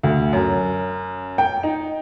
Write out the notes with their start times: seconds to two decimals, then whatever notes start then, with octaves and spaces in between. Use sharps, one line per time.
0.03 D2
0.33 F#2
1.38 G5
1.63 D#4